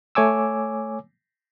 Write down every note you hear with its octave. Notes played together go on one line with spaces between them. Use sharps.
A3 C#5 G#5 D6 E6